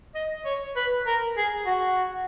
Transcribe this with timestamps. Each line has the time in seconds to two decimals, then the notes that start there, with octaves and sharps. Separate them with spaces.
0.15 D#5
0.45 C#5
0.76 B4
1.07 A#4
1.37 G#4
1.66 F#4